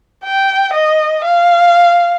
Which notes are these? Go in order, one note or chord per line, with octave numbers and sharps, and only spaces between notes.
G5
D#5
F5